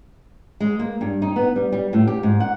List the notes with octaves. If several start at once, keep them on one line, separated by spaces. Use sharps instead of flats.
G#3
A#3
G2
D#4
B3
G3
G3
A2
G4
G#2
F#5